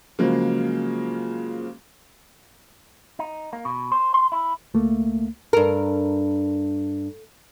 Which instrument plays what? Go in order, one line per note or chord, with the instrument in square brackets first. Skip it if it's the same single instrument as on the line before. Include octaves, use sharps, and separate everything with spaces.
[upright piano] C#3 F3 F#3 G#3 A#3
[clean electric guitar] D#4
A#3
B2
C5
C6
E4
[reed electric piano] C#2 A3 A#3
[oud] G2 A#4 [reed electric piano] A4